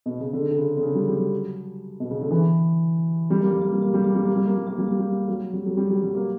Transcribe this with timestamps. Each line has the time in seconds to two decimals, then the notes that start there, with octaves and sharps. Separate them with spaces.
0.06 B2
0.20 C#3
0.33 D3
0.51 D3
0.58 C#3
0.77 D3
0.82 C#3
0.95 G3
1.07 G3
1.20 F#3
2.00 B2
2.10 C#3
2.21 D3
2.31 E3
3.30 G3
3.41 A#3
3.51 G3
3.62 A#3
3.72 G3
3.82 A#3
3.94 G3
4.04 A#3
4.15 G3
4.25 A#3
4.36 G3
4.46 A#3
4.57 G3
4.67 A#3
4.78 G3
4.88 A#3
4.99 G3
5.28 F#3
5.53 G3
5.66 F#3
5.77 G3
5.90 F#3
6.03 G3
6.15 A#3